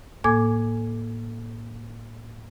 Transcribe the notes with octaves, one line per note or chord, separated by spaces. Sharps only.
A2 A#3 A4 G#5 D6 G#6